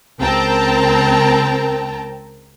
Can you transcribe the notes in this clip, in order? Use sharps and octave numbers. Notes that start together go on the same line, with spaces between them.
C#2 C4 A#4 G5 A5 A#5